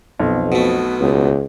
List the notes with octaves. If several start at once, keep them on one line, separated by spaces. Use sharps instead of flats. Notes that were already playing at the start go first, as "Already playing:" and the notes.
B1 F2 B3
B2 A3 B3
C#2